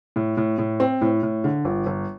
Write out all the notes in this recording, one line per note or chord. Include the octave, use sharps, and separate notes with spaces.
A2
A2
A2
C4
A2
A2
D3
G1
G1